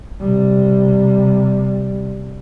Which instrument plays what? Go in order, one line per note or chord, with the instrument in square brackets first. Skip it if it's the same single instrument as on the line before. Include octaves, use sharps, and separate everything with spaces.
[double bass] C3 G3